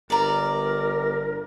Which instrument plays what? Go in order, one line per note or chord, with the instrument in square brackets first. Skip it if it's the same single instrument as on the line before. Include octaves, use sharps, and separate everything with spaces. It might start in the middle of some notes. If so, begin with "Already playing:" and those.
[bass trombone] G1 [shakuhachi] A#4 [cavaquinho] D5 A#5